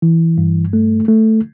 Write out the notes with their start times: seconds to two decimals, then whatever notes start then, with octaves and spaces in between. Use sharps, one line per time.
0.02 E3
0.38 G2
0.73 A3
1.08 A3